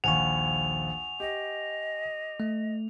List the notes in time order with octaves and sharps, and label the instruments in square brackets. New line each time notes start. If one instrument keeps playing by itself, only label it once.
[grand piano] A#1 D#2 [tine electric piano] F#5 G#5 C#6 [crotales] F7
[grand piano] G4 [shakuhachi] D#5
[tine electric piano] A3